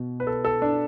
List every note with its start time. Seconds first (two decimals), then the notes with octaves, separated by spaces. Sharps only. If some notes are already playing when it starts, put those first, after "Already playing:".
Already playing: B2
0.20 B4
0.27 A4
0.45 A4
0.62 D4